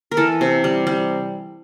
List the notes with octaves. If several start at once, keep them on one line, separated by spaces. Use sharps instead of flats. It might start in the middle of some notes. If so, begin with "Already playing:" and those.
A#4
E3 A4
C3
G3
G3